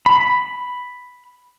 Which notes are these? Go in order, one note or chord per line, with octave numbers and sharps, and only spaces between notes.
B5